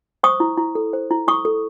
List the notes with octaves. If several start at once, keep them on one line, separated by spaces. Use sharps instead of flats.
C5 C#6 D#6
E4
E4
A4
C5
E4
E4 C#6 D#6
A4